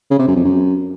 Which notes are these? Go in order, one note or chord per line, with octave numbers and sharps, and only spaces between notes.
C#3
C3
F#2
F2
F#2